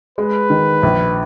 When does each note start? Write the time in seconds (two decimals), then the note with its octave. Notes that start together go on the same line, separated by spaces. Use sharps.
0.18 G#3 B4
0.50 D#3
0.83 A#1